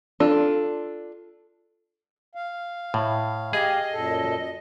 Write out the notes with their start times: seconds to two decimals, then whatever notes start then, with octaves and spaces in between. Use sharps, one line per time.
0.20 D4 F4 A4
2.35 F5
2.94 A2
3.53 G4 G#4 D#5 F5
3.92 F#2 A#2 A4